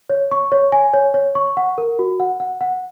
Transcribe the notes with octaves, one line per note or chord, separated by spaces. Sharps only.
C#5
C#6
C#5
G#5
C#5
C#5
C#6
F#5
A#4
F#4
F#5
F#5
F#5